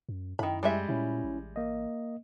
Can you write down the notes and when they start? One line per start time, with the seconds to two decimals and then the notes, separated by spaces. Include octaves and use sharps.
0.09 F#2
0.39 F#2 D#3 E4 B5
0.63 G3 G#3 E5
0.89 A#2 C#4 E4
1.24 A1
1.56 A#3 D#5